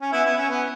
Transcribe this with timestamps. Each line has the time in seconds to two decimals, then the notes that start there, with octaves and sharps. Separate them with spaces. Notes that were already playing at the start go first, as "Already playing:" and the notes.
0.01 C#4
0.12 B3 E4
0.25 B3 E4
0.37 C#4
0.50 B3